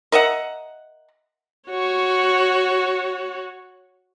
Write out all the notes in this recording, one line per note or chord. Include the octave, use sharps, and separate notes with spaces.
A#4 D#5 E5 F#5
F#4 C#5